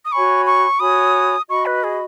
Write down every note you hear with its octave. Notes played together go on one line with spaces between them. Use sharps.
D#6
F#4 C#5 G#5 B5 C#6
C#6
F#4 C#5 G#5 B5 D#6
F#4 D#5 B5 C#6
B4
G#4